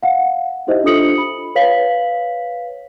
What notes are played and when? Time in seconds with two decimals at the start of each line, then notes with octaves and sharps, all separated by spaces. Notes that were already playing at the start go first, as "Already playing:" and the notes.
0.03 F5 F#5
0.67 D#4 E4 G4 C5 D#5 E5
0.84 D4 F4 A4 D#6 C#7 F#7
1.18 B5
1.55 B4 C#5 F5 B6 F#7